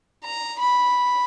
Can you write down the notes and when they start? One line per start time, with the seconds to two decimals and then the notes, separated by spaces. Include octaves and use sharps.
0.24 A#5
0.59 B5